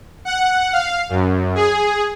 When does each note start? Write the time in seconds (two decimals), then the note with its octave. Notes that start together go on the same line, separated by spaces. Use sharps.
0.25 F#5
0.73 F5
1.09 F#2
1.55 G#4